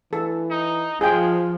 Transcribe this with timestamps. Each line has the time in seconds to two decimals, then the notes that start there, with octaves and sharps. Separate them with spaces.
0.13 E3 A4
0.51 D#4
1.01 F3 G#3 F4 G#4 G5